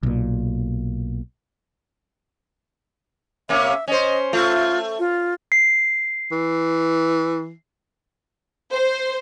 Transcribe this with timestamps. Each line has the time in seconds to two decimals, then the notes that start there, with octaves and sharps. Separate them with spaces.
0.03 B1 A#2
3.49 C3 A#3 C#4 E5
3.88 C#4 C5 D#5
4.33 A3 F4
4.99 F4
5.52 C7
6.31 E3
8.72 C5